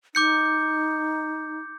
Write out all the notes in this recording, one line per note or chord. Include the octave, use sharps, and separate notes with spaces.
D#4 D6 G6 C#7